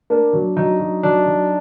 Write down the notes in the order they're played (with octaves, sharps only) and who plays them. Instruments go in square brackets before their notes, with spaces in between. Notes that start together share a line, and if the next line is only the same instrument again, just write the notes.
[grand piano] A#3 [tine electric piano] D4
[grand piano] F#3
[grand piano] F#3 [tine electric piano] D#4
[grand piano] F#3
[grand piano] F#3 [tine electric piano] D4
[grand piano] F#3